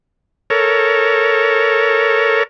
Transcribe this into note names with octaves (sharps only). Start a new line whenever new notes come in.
A4 A#4 C#5